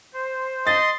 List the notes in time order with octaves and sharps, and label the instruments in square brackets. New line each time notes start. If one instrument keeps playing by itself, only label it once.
[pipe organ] C5
[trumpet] D#5 [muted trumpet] C6 [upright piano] A6